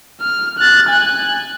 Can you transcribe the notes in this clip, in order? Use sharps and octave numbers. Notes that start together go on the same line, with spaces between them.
F6
F#6 A6
G#5 F#6